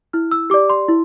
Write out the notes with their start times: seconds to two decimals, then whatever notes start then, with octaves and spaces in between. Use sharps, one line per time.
0.13 E4 F6
0.31 E6
0.50 G4 D5 D6
0.70 C6
0.88 E4